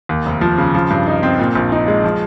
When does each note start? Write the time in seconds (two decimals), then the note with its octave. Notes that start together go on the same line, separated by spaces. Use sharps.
0.09 D#2
0.26 F1
0.41 F3
0.58 C#3
0.74 F3
0.90 G2
1.07 D#4
1.23 C4
1.39 A#2
1.55 A#1
1.72 D#4
1.88 G#3
2.04 F3